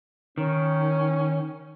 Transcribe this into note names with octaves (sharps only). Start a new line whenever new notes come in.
D#3 C#4